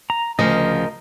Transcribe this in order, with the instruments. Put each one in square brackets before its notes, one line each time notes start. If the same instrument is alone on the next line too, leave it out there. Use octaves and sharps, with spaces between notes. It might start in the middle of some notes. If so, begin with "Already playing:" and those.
[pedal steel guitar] A#5
[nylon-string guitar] D2 C#3 F3 [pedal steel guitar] A#4 D#5